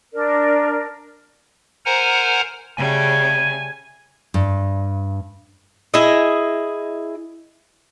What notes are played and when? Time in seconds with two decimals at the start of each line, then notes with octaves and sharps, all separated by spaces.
0.14 D4 A#4 D5
1.86 A#4 C5 F#5 G#5 A#5
2.77 C#3 G3 A3 G#5
4.34 G2
5.94 E4 G#4 D#5